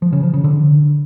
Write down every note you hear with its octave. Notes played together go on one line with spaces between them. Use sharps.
F3
C#3
F3
C#3
D3